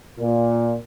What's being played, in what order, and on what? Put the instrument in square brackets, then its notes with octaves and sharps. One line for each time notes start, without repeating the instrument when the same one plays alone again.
[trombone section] A#2